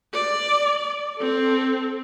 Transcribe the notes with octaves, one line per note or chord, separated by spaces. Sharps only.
D5
C4 A4